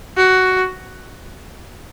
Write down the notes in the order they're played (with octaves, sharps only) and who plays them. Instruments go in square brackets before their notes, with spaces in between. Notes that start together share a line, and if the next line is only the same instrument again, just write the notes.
[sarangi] F#4